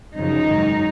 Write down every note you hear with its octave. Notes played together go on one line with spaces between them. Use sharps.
F#2 C#3 F3 D#4
G#2 D#3 F#3